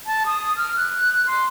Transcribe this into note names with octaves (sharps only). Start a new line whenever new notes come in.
A5
D#6
F6
F#6
C6